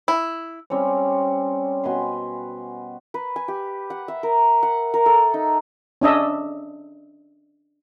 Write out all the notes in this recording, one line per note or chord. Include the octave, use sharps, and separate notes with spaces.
E4
G3 C4 C#4 C#5
B2 B4 G#5 C6
B4
G#5
G4
F#5
E5
A#4
F#5
A#4
A4
D#4
C#4 D4 D#5 E5